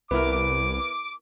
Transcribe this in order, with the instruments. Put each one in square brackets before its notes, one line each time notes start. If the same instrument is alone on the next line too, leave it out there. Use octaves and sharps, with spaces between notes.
[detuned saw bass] C2 [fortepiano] B3 E4 A#4 [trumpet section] D6